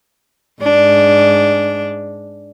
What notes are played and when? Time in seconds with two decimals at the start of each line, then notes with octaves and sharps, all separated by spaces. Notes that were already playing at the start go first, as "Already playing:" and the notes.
0.62 G#2 D4